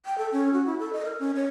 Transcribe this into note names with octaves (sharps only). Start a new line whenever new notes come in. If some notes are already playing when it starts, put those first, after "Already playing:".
G5
A4
C#4
F#4
E4
A4
D#5
A#4
C#4
C#5